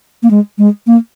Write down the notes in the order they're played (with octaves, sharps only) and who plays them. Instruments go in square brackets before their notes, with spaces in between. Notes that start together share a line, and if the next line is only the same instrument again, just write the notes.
[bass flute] A#3
G#3
G#3
A#3